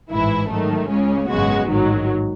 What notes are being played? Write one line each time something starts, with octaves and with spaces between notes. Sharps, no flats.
A1 G#2 E3 G#3 E4
G#2 D#3 F#3 A3
C#2 C#3 G#3 C#4
G#1 F#2 C#3 G#3 B3 F#4
A1 G#2 D#3 F#3